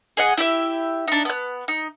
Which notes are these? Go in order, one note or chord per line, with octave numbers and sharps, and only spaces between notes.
G#4 D#5 F#5
E4 G4 E5
D4 D#4
B3 F#6
D#4